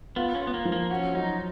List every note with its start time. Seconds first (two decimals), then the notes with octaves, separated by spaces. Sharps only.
0.16 B3 F4
0.35 C#4
0.41 F4
0.47 B3
0.54 A#3
0.65 F3
0.72 A#3
0.91 C#4 F#4
1.15 F#3 D#4